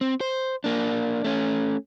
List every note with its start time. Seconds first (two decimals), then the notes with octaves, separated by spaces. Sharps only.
0.01 C4
0.21 C5
0.64 A#3 D4
1.24 A3 C#4